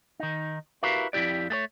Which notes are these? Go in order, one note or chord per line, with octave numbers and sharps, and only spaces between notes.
D#3 D#4
E4 F#4 G4 A#4 B4 F5
F2 D#3 E4 G4 D5
A3 G#4 C#5